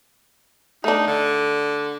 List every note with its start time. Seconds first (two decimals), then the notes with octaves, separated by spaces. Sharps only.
0.84 A3 D4 D#4
1.07 D3